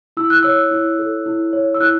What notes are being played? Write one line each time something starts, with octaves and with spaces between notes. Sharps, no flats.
E4 E6
F#6
C#5 E6
E4
A4
E4
C#5
E6
E4 F#6